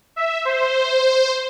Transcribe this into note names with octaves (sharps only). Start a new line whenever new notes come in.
E5
C5